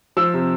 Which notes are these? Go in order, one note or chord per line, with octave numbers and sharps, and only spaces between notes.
F3 E6
C3